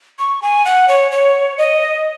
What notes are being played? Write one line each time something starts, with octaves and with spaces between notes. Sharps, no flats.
C#6
G#5
F#5
C#5
C#5
D#5